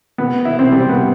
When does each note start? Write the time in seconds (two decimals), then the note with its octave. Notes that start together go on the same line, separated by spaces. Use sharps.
0.18 B3
0.45 E4
0.59 C4
0.72 G3
0.89 B3